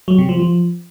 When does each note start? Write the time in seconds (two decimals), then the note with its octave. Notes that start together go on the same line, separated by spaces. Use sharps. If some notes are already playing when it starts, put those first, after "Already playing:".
0.08 F#3
0.18 C3
0.29 F3
0.39 F3